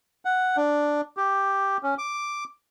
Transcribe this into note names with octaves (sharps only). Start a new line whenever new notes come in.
F#5
D4
G4
C#4
D6